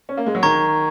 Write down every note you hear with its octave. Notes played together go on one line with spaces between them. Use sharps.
C#4
A#3
G#3
F#3
D#3 A#5 C#6 G#6